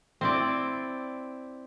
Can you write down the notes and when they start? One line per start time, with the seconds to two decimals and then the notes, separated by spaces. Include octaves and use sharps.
0.21 C4 E4 D5